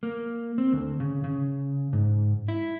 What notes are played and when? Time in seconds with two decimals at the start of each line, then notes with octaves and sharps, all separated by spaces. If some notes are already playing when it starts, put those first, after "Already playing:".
0.03 A#3
0.58 C4
0.73 D2
1.00 C#3
1.24 C#3
1.93 G#2
2.48 E4